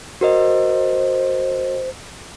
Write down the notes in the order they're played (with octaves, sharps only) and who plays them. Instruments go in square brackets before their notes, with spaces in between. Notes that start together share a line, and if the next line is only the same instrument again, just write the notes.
[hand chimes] F#4 A#4 D#5 [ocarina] C5